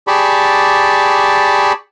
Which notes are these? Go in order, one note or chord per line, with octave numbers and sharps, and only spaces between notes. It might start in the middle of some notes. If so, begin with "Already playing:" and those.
G4 G#4 D5 A5 B5 C#6